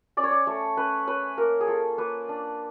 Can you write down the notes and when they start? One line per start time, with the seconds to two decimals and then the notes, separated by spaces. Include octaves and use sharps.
0.17 C#4 D5
0.24 C#5
0.31 D5
0.47 A3 C#5
0.77 C#4 B4
1.07 C#4 B4
1.37 A#3 A#4
1.61 G#4
1.67 F4 A4
1.98 A#3 B4
2.29 D4